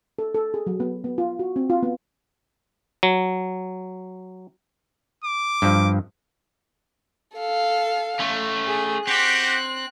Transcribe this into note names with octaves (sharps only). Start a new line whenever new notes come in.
A4
A4
G#4
F#3
B3
B3
F4
F#4
C4
F4
B3
F#3
D6
G2 F3
A4 F5
A3 C#4
G#4
C4 F#4 G4 F#6